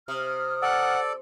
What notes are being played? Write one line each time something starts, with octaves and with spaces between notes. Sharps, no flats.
C3 D#6 F6
A4 D5 F#5